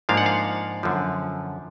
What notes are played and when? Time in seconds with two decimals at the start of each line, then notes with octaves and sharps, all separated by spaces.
0.09 G#2 F3 A#3 D4 F5
0.17 F#5
0.26 F5
0.83 F#2 D3 F3